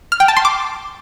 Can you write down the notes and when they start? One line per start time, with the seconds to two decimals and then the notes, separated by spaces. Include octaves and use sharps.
0.12 F6
0.20 G5
0.28 A5
0.37 C6
0.45 D6